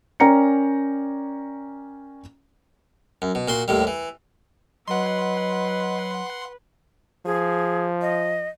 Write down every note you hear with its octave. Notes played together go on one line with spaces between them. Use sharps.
C#4 A#4 D5 G5 A#5 C#7
F#2
B2
A#2 F#4 C6
D#2 A2 G3
E3
F#3 B4 D#5 F#5 C6
F3 G#4
D#5